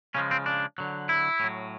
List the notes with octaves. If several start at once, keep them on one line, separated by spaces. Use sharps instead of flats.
C#3 F3 G#3 C#4
C4
D4
D3 F#3
E4
A2 F#3